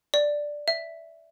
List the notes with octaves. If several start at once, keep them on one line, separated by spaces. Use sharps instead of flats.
D5
E5